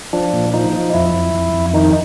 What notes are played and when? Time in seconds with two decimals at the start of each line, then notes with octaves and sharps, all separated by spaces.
0.13 F3 D4
0.33 A#2
0.54 F3 D#4
0.73 F3
0.94 F2 E4
1.13 F2
1.34 F2
1.54 F2
1.74 D#3 D#4